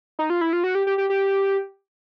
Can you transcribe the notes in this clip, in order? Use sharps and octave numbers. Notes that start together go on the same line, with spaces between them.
D#4
F4
E4
F4
F#4
G4
G4
G4
G4